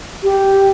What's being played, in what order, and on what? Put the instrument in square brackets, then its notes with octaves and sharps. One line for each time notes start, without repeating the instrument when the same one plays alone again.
[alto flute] G4